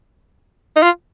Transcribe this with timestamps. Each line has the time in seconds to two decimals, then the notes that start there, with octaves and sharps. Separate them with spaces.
0.76 D#4
0.83 F4